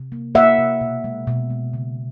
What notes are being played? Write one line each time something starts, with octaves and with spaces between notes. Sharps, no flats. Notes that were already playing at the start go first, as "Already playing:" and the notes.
Already playing: C3
A#3
A#3 E5 F#5
C3
B2
G#3
B2
G#3
C#3